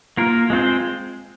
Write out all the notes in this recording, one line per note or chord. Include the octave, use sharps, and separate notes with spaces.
A#3 F4 A#4
G#3 C4 F4 C5